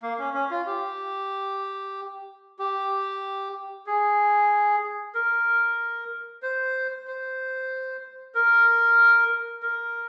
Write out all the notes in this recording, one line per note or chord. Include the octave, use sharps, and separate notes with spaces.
A#3
C#4
C#4
F4
G4
G4
G#4
A#4
C5
C5
A#4
A#4